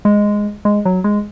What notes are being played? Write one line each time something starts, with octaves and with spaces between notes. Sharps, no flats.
G#3
G#3
F#3
G#3